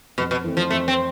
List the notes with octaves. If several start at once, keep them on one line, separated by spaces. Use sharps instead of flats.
F2 B2
B2
E3 A3 C4
F3
F2 A3
C4